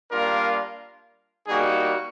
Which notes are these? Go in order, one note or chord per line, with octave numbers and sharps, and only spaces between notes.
G3 A#3 D4 F4 A#4
G3 A#3 D#4 F#4 G#4